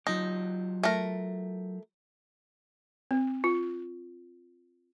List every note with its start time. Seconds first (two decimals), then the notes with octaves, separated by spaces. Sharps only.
0.07 F#3 D#4 F4 G4
0.83 A3 A#4
3.11 C4
3.44 F4